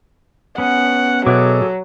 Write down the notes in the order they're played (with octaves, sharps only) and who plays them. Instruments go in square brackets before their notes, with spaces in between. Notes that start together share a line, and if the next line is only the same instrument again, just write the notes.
[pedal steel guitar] B3 C#4 [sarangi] F#5
[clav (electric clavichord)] B2 E5 F#5 [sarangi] F#3 [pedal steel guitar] G#4 A4 D6